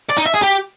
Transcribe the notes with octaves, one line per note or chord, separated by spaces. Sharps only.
D5
D#4
E5
G#4
G4